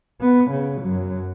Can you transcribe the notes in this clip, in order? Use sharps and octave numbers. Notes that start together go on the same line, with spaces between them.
B3
C#3
F#2 F#3